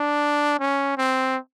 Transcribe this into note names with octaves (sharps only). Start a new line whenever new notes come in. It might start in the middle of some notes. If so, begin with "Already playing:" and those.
Already playing: D4
C#4
C4